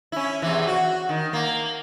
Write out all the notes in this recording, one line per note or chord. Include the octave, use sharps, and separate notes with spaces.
C#4 E4
E2 C3 E3
F#4
D#3
A#3